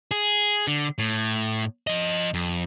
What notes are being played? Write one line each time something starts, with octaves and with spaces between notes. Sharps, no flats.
G#4
D3
A2
F3 D#5
F2